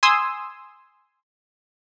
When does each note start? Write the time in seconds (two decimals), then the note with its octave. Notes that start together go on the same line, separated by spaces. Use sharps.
0.03 G#5 C6 D#6 E6